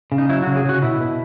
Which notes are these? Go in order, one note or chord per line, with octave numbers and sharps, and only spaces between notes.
C#3
D#4
F#3 E4
C#3 F#4
G#4
C#3 F#4
B2 E4
B2